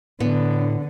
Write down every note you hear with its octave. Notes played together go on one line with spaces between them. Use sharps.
A2 D3 B3